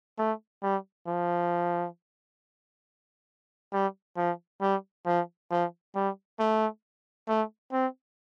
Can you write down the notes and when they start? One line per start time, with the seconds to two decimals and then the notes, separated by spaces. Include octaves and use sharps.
0.18 A3
0.62 G3
1.07 F3
3.73 G3
4.17 F3
4.62 G3
5.07 F3
5.51 F3
5.95 G3
6.40 A3
7.29 A3
7.73 C4